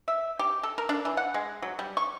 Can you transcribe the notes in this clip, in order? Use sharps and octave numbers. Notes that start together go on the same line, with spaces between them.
E5
G4
A4
A#4
D4
E3
F#5
G#3
F#3
G3
C#6